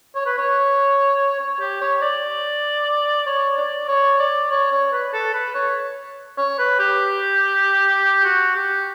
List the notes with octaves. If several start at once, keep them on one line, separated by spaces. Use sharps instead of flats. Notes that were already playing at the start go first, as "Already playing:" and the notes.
C#5
B4
C#5
C#5
G4
C#5
D5
C#5
D5
C#5
D5
C#5
C#5
B4
A4
B4
C#5
C#5
B4
G4
F#4
G4